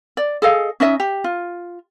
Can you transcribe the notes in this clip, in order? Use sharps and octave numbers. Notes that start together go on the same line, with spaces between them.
D5
G#4 A4 D#5 F5
C#4 D#4 D#5 E5
G4
F4